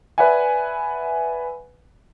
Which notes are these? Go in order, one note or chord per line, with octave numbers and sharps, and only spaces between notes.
B4 D5 E5 F#5 G#5